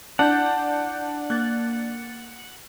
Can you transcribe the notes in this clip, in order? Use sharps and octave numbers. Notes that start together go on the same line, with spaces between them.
D4 E4 F#5 A5 G6
A#3 F#6 A6